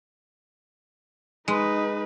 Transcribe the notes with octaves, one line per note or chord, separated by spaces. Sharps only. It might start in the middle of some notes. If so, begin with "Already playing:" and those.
G#3 D#4 B4